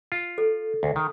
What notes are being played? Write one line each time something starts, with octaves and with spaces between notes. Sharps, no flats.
F4
A4
D2
D#3